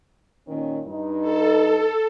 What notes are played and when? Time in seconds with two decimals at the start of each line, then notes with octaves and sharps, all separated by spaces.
0.48 A#2 D#3 C#4
0.86 G2 D#4
1.21 A4